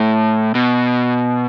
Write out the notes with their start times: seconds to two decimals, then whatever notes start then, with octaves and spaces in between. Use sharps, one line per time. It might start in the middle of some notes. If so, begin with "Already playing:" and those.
Already playing: A2
0.55 B2